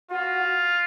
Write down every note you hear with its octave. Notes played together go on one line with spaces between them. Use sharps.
F4 F#4